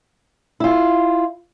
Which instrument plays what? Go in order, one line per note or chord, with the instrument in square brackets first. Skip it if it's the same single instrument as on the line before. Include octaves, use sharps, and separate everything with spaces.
[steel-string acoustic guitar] E4 F4